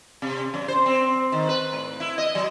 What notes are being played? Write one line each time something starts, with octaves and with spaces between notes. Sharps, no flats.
C3
F#2
C5
C4
D#3
B4
A2
E4
D#5
F#3